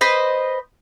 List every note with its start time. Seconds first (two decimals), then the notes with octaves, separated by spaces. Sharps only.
0.01 B4 C5 D#5